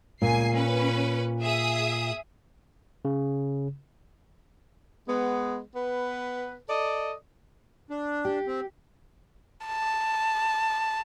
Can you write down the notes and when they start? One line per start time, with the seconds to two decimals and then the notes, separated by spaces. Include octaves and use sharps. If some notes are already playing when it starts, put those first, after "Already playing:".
0.22 C#2 A#2 G#5 C7
0.54 C#4 B4
1.41 G#4 E5 D#6
3.05 C#3
5.08 G#3 B3
5.74 B3 B4
6.69 A4 D5 D#5
7.90 D4
8.25 G4
8.47 C4
9.66 A5